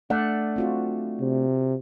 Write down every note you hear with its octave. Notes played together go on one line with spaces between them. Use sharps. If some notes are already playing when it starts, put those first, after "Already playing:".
A3 D4 D5 F#5
C4 F4 F#4
C3